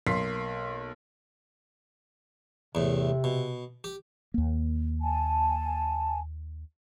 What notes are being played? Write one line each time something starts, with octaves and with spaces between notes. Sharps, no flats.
B1 A#3 C6 B6 C7
E2 A2 C3
B2
G4
D#2 A#3
G#5 A5